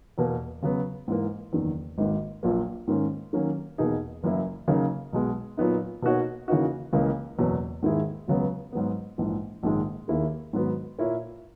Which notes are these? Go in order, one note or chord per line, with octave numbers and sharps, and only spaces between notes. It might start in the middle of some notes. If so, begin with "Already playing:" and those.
E2 B2 A#3
C#3 F#3 B3
G#2 E3 A#3
F#1 E2 D#3
G#1 G#2 D#3 A#3
A#1 A#2 F#3 A#3
G#2 D#3 A#3 C#4
D#3 F#3 A#3 C#4
E2 B2 A#3 D#4 G#4
F#1 F#2 E3 A#3 E4
C#3 F#3 A#3 D#4
B1 B2 G#3
A#2 F#3 B3 D#4
B2 A#3 D#4 F#4 C#5
C#3 E3 A#3 D#4 F#4
C#2 C#3 E3 A#3
F#1 E2 B2 F#3
G#2 D#3 A#3 E4 G#4
C#2 C#3 F#3 B3
G#2 F#3 B3
A#1 G#2 E3
A#1 G#2 D#3 G#3
D#2 D#3 A#3 E4 G#4
G#2 D#3 F#3 B3 F#4
A#2 A#3 E4 A#4 C#5